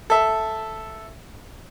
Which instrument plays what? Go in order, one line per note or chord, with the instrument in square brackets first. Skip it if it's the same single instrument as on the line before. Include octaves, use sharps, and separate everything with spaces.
[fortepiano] A4 E5